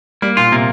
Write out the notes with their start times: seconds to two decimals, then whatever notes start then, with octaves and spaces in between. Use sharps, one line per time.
0.22 G3 A#3
0.37 A#2 F4
0.52 C3 A#3